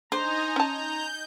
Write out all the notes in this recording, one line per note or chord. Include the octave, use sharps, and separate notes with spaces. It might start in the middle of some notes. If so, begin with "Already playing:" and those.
D4 D#4 C5 D#5 G#5 A#5
C#4 A5 G6